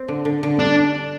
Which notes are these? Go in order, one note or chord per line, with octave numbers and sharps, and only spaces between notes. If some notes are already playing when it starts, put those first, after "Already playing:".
Already playing: C4
D3
D3
D3
G3 D4